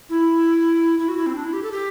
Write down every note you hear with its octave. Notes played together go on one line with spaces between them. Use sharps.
E4
E4
F#4
E4
C4
D4
E4
G4
A4
G4